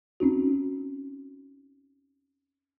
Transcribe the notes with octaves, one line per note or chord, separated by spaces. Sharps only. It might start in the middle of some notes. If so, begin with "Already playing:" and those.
C4 C#4 D#4 F#4